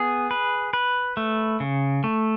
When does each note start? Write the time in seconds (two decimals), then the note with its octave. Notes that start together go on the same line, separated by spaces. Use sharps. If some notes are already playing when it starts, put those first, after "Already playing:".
Already playing: B3 G#4
0.31 B4
0.73 B4
1.17 A3
1.60 C#3
2.04 A3